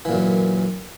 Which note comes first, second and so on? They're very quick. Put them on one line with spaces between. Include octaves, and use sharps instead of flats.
E3 A#2 F#2